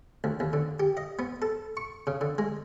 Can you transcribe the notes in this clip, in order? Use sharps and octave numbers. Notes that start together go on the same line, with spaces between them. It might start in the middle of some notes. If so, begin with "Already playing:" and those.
D2
D#2
D3
G4
D#5
B3
A4
C#6
C#3
D3
G#3